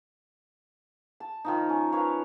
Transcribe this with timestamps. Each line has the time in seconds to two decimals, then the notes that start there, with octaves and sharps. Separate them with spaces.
1.20 A5
1.44 D#3 F3 D#4
1.69 C#4
1.92 A#4 B4 C#5 F5